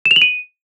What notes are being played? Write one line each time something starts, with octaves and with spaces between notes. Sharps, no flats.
E7
F7
F#7
D#7